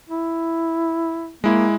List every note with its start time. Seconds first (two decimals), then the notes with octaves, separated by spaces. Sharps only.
0.09 E4
1.44 G#3 A#3 E4